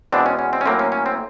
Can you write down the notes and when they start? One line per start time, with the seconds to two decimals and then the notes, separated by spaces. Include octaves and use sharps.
0.12 E2 B2 G#3 B3 C4 D4
0.26 C#4
0.39 C#4
0.53 C4
0.61 C#4
0.66 A2 F#3 A#3 C4
0.79 C#4
0.92 C#4
1.06 C4